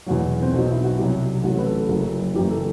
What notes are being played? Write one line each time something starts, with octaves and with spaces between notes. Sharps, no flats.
E2 B2 F#3 F#4
C4
B1 B2 F#3 D#4
E4
F#4
C2 C3 F#3 G4
A1 A2 F#3 F#4
B4
A4
F#1 F#2 F#3
F#1 F#2 E3 G4
A4